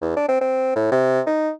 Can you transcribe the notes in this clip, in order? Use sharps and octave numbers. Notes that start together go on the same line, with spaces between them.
E2
D4
C4
C4
A2
C3
D#4